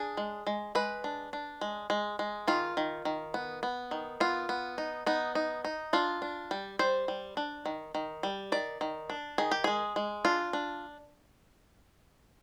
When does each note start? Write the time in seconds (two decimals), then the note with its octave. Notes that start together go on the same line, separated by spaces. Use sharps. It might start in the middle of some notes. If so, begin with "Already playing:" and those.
Already playing: D4 G#4
0.17 G#3
0.47 G#3
0.75 G#3 B4
1.04 D4
1.33 D4
1.61 G#3
1.90 G#3
2.19 G#3
2.47 D#3 F4
2.77 D#3
3.05 D#3
3.34 B3
3.63 B3
3.91 D#3
4.20 B3 F4
4.49 B3
4.78 D#4
5.06 B3 D#4
5.35 D#4
5.65 D#4
5.93 D4 F4
6.22 D4
6.51 G3
6.79 G3 C5
7.08 G3
7.37 D4
7.66 D#3
7.95 D#3
8.23 G3
8.52 D#3 D5
8.81 D#3
9.10 D4
9.38 D#3 G#4
9.51 G4
9.64 G#3 G#4
9.96 G#3
10.25 D4 F4
10.53 D4